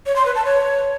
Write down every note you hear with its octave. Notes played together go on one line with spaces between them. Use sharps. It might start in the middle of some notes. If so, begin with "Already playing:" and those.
C#5
C6
B4
A5
C#5